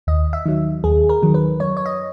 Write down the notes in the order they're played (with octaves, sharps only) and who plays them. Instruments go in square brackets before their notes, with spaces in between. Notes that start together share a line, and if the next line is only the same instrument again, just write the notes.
[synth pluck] D#2 D#5
E5
D#3 F#3
D#2 G#4
A#4
D#3 F#3
B4
F#2 C#5
C#5
D#5